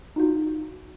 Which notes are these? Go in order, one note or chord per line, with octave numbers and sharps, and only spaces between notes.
D#4 F4 F#4